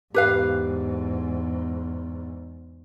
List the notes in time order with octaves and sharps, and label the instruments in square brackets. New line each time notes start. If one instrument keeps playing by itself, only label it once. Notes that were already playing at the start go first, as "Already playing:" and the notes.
[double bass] E2 G#2 [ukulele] G4 B4 F5